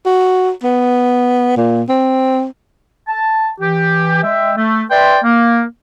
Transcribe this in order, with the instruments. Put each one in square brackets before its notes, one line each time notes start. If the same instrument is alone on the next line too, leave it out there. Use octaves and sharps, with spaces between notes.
[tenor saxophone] F#4
B3
A#2
C4
[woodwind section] A5
E3 G4
G#3 E5 G5
A3
B4 D5 E5 G5 C6
A#3